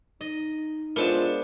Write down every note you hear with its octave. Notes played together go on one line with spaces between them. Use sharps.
D#4 D#5
G#3 B3 D4 F4 A4 A#4 C5 E7